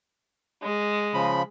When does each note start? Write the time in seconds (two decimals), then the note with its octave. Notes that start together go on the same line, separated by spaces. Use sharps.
0.62 G#3
1.14 C#3 F3 B5